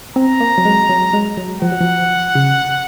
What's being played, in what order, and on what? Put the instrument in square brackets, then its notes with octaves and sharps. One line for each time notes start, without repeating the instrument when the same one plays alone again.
[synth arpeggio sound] C4 [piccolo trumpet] A#5
[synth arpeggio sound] A#3
F#3
G#3
F#3
G#3
F#3
[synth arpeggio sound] F3 [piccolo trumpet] F#5
[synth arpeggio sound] F#3
F3
C#3